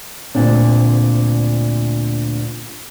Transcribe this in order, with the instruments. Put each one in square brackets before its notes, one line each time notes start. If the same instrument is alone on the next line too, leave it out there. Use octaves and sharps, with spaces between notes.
[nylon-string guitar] D2 A#2 C4 D4